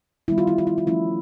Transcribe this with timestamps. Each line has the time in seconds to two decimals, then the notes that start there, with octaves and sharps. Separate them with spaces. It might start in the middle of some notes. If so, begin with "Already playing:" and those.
0.28 D#3 G3 B3 E4
0.38 F4
0.47 E4
0.58 F4
0.67 E4
0.78 F4
0.87 F3 A3 C#4 E4